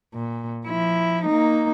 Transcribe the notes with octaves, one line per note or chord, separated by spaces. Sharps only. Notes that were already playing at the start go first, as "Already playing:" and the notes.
A#2
F3 E4
A#3 D#4